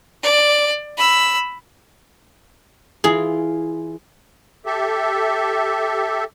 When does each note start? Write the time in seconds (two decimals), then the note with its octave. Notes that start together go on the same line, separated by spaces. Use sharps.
0.23 D5
0.98 B5 E6
3.04 E3 F4 G#4
4.66 G4 A4 E5